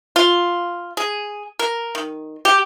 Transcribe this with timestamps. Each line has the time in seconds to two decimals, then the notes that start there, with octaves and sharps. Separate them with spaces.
0.16 F4
0.97 G#4
1.59 A#4
1.95 D#3
2.45 G4